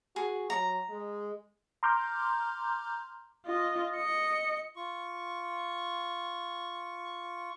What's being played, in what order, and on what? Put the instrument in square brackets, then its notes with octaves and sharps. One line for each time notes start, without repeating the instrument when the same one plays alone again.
[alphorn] F#4 [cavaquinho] G#4
[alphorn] F#3 [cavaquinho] A#5
[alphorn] G#3
[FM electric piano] A#5 C6 D6 F6 G6
[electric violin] F4 D#5
D#5 C#7
[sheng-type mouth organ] F4 C#6